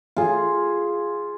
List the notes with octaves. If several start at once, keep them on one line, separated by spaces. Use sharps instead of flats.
F4 G#4